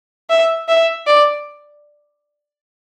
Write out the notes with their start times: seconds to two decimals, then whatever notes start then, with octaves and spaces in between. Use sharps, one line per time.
0.30 E5
0.69 E5
1.07 D5